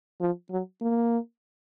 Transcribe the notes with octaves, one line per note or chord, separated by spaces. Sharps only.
F3
F#3
A#3